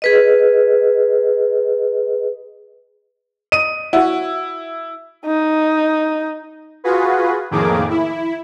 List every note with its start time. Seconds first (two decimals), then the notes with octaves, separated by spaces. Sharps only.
0.02 G#4 B4 D#5
3.52 D#5 D#7
3.93 E4 F#4 E5 F#5
5.25 D#4
6.84 F4 F#4 G#4 B4
7.51 F2 A2 D#3 A#3 G#4 D6
7.90 E4